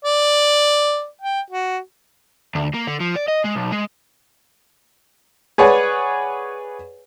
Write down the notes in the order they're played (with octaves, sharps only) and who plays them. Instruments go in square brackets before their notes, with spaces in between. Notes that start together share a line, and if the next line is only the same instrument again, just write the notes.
[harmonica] D5
G5
F#4
[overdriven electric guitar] D2
A#3
D3
F3
D5
D#5
G#3
B1
G#3
[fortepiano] G#4 B4 C#5 D5 F#5 G#5